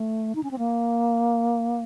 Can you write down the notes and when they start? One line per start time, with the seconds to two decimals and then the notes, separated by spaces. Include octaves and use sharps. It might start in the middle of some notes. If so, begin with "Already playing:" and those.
Already playing: A3
0.35 D#4
0.43 C#4
0.51 C4
0.58 A#3